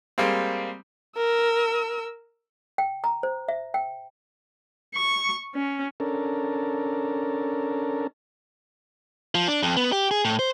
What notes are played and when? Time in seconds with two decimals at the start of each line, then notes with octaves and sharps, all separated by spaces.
0.18 G3 G#3 A#3 C4
1.17 A#4 E6
2.78 G5
3.04 A#5
3.23 C5
3.48 E5
3.74 G5
4.95 C#6
5.55 C#4
6.00 C#4 D4 A4 A#4
9.35 F3
9.48 D4
9.63 F2
9.77 B3
9.92 G4
10.11 G#4
10.25 A2
10.39 C5